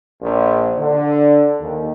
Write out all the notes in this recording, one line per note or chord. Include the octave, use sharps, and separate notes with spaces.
A#1
D3
D#2